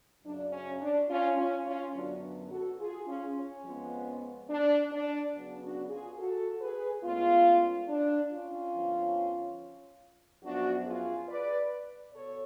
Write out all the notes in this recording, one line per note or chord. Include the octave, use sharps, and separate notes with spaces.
F#2 C#3 F#3 D4
C#4
D4
C#4 F4
C#4 F4
C#4 F4
F#2 D3 F#3 B3 D4 F#4
F#4 A4
F4 G#4
C#4 F4
C#4
F2 F3 G#3 B3
D4
D4
C#3 F#3 B3
D4 F#4
F4 G#4
F#4 A4
G#4 B4
A2 G#3 B3 C#4 F4
D4
C#4 F4
F2 D3 F3 B3
F#2 F3 B3 D4 F#4
F4 G#4
B4 D5
B2 A4 C#5